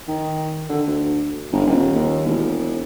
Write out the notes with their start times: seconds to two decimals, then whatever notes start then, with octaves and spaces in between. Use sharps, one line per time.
0.08 D#3
0.69 D3
0.87 D2
1.52 G1
1.66 D#1
1.95 D#2
2.26 E1